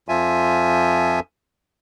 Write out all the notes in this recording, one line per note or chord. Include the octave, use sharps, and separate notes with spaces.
F2 F3 F4 E5 G#5